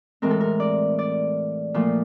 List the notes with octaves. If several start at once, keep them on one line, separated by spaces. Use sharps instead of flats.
A2 E3 G#3 C4 A#4
A4
A#4
D5
D5
A#2 F3 A3